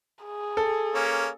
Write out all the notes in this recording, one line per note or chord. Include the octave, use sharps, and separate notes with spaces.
G#4
A4
A#3 C#4